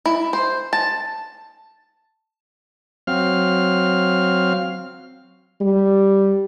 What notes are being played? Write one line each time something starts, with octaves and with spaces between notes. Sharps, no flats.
E4
C5
A5
F#3 C4 F5 F6
G3